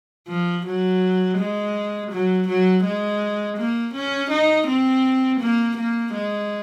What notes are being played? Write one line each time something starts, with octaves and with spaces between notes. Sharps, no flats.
F3
F#3
G#3
F#3
F#3
G#3
A#3
C#4
D#4
C4
A#3
A#3
G#3